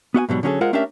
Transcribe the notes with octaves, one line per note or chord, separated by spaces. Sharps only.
B3 F#4 E5 G#5
G#2 B2 F#3 G3
D3 F#3 C#4 F4 G#4 A4
G#3 F4 A#4 C5 F#5
A3 C#4 D4 G4 A#4 E5